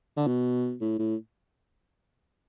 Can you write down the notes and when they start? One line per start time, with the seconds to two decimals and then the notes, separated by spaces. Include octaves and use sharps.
0.17 D3
0.27 B2
0.81 A2
0.99 A2